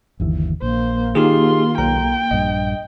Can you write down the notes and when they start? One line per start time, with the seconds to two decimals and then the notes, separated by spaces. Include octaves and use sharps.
0.20 G1 D#2 E3
0.62 A#1 A#3 C5
1.15 D#3 D#4 F4 G4 G#4 C6
1.78 B1 G5 A#5
2.31 A#1 G2 D#5